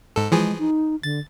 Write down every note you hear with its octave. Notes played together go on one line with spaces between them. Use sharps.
G#2 A4
E3 F3 G#3 G#4
D#4
D3 A6